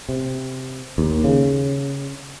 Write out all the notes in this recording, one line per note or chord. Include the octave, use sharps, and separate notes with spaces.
C3
D#2
C#3